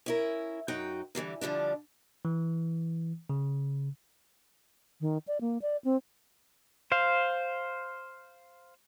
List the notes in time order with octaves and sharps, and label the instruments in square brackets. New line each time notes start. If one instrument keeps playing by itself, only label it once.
[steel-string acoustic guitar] C#4 E4 A#4
F#2 D#4 F#4 G5
D3 E3 G3 A#3
D3 F3 G3 D4
[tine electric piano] E3
C#3
[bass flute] D#3
D5
A#3
D5
C4
[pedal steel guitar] C5 F5